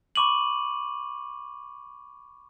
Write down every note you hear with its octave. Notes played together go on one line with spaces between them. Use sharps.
B5 C#6 D6 D#7 F#7